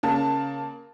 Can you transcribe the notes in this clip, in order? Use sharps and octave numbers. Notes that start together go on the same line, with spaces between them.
C#3 A#3 A5